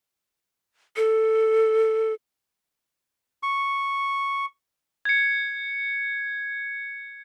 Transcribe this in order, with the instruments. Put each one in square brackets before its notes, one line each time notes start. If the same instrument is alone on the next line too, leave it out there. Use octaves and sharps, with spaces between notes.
[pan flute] A4
[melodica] C#6
[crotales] G#6 C#7